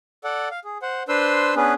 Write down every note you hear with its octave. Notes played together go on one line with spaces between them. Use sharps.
A4 D5 F#5
F5
G#4
C5 F#5
D4 B4 C5 C6 E6
B3 C#4 D4 G#4 B4